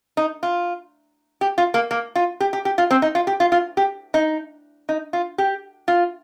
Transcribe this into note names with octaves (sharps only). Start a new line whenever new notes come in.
D#4
F4
G4
F4
A#3
A#3
F4
G4
G4
G4
F4
C4
D#4
F4
G4
F4
F4
G4
D#4
D#4
F4
G4
F4